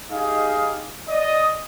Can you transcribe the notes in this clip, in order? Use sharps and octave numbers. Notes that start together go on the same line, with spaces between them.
D#4 G4 G#4 D#5 F5
D5 D#5